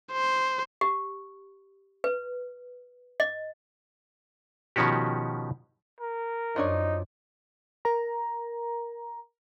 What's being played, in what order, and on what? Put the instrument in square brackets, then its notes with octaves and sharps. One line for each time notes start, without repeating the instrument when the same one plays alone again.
[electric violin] C5
[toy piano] G4
B4
D#5
[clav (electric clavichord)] B2 D#3 F3 C#4 F#4 G4
[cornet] A#4
[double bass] F#2 [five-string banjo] F3 D4 C#5 [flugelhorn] D#4
[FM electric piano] A#4 A#5